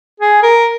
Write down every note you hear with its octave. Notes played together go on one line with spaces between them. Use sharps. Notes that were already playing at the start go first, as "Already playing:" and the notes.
G#4
A#4